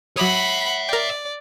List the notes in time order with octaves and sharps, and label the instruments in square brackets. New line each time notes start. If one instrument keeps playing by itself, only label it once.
[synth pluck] F#3 D6 D#6 [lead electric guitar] C#5 E5 [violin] F#5 B5
[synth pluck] A#4 G5 [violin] D5